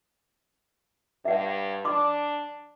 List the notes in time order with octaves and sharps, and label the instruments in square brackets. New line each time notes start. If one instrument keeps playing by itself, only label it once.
[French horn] G2 [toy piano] E5 F#5
[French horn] D4 [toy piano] C6 D6